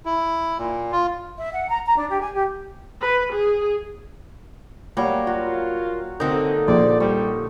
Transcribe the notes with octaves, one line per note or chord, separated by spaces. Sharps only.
E4
A#2
F4
E5
F#5
A#5
A#5
D4
G4
G#5
G4
B4
G#4
F#3 G3 A#3 C#5
F4 F#4
D3 A#3 C4 D#4
A#1 C5 D5
G3 C#6